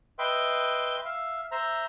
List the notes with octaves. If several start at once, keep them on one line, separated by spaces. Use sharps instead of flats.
B4 D#5 E5 G5 C6
E5 F5
C5 E5 A#5